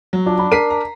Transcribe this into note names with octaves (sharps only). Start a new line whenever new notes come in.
F#3
D4 F4
B5
A#4 B6 C7 D#7
A#5